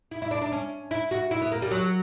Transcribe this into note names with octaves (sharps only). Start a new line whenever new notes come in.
E4
E4
D4
D4
C#4
E4
F#4
E4
B3
A#3
G3
F#3